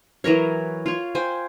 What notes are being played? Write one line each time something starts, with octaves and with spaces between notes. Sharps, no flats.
E3 F#3 A#4 C#5
F4 C#5
C5 G5 G#5